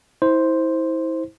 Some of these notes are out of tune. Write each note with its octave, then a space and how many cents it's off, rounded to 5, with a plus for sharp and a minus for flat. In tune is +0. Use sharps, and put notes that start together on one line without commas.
E4 -30 C5 +0